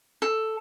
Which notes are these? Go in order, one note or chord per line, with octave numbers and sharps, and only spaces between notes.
A4